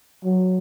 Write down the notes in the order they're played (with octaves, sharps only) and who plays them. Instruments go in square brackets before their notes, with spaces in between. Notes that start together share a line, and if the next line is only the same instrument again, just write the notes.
[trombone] F#3